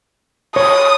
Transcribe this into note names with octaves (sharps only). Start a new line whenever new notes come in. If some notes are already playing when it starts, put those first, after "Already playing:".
C#5 D#6